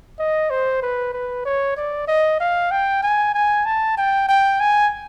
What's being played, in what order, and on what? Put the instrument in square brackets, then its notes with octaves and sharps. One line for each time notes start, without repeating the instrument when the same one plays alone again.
[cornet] D#5
C5
B4
B4
C#5
D5
D#5
F5
G5
G#5
G#5
A5
G5
G5
G#5